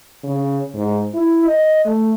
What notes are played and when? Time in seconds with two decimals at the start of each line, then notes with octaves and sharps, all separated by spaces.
0.24 C#3
0.75 G#2
1.14 E4
1.46 D#5
1.86 A3